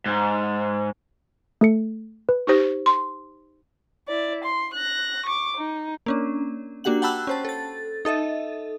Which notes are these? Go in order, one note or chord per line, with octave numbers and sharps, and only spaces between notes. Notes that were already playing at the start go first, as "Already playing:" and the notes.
G#2
A3 A4 C#7
B4
D#4 G4 C5
C6
E4 D5
C6
F#6 A#6
C#6 D6
D#4
A#3 C#4 D4
A#3 D4 F#4 G4 F#5 F#7
F#5 G5 A5 B5 E6 F#6
C#4 C5 A5
A4 A6
D#4 A4 D#5 E5